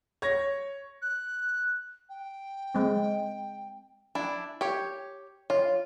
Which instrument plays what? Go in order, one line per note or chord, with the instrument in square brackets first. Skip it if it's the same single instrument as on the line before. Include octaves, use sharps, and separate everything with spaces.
[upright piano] C#5 G#6 A#6
[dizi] F#6
G5
[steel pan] G#3 C4
[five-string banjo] D4 E4
G4 C#5
[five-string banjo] F4 [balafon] C#5